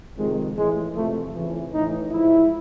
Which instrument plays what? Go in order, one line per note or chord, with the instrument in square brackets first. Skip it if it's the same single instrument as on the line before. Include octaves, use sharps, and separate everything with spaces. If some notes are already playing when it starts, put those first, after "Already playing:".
[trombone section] F2 C3 D#3 G#3
A2 E3 G#3
F2 C3 F3 A3
F2 C#3 E3
A2 E3 D#4
G#2 F3 E4